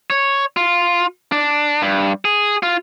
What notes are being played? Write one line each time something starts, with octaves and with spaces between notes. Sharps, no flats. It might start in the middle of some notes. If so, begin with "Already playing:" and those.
C#5
F4
D4
G2
G#4
F4